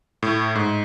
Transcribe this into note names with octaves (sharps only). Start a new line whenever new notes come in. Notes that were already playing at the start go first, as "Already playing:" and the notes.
A2
G#2